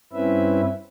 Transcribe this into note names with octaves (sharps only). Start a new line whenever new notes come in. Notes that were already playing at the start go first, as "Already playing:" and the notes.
G2 C4 C#4 E4 B4 E5